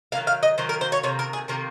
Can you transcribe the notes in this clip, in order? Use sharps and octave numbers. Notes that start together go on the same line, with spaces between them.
D#3 F#3 A#3 F5
F5
D#5
D#3 F#3 A#3 C5
A#4
C5
C#5
C3 D#3 A#3 C#5
A#4
G#4
C3 D#3 A#3 A#4